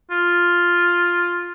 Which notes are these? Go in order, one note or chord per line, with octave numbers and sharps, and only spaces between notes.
F4